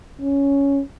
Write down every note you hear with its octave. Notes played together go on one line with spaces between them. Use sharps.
C#4